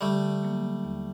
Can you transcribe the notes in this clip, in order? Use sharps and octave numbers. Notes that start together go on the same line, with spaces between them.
D3 G3 A3
F#3 A#3
D#2